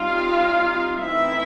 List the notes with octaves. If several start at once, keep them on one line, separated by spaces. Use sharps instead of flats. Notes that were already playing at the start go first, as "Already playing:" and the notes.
Already playing: G3 C4 D#4 F4 F5
E3 A3 C4 D#4 E4 E5